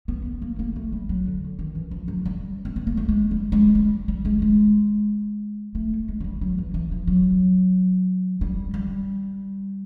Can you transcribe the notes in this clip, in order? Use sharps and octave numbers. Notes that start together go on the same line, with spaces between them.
B3
B3
A#3
A#3
A3
G3
F#3
D3
D#3
E3
F3
F#3
G3
C4
B3
A#3
A3
G#3
G3
G#3
G3
G3
G#3
G#3
A3
G#3
F#3
G3
F#3
E3
E3
F3
F#3
G3
G3